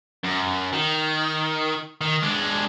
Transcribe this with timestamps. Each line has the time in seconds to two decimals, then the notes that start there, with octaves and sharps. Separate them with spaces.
0.24 F#2
0.73 D#3
2.01 D#3
2.23 G#3 D4